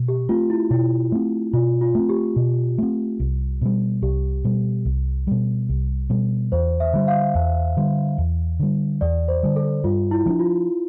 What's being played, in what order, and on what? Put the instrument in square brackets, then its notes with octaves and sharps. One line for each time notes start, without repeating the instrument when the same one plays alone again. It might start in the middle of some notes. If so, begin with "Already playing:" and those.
Already playing: [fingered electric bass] B2
[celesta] G4
[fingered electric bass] A3 C4 [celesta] F4
[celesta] E4
[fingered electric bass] B2 [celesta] E4
[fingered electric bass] A3 C4
[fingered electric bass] B2 [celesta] F4
[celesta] F4
[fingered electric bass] A3 C4
[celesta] G4
[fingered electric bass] B2
A3 C4
C2
B2 G3
[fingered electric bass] C2 [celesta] G4
[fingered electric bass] B2 G3
C2
B2 G3
C2
B2 G3
[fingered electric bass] E2 [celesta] C5
[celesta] E5
[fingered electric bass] D3 G3
[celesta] F5
[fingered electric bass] E2
D3 G3
E2
D3 G3
[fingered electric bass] E2 [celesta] D5
[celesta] C5
[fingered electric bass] D3 G3
[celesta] A4
[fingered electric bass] G2 [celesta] F4
[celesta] E4
[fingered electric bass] F3 A3 D4
[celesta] F4